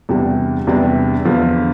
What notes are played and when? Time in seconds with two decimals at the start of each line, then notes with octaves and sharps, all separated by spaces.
0.09 E2 C3 G3 D4
0.67 E2 C3 G3 D4
1.25 E2 D3 F3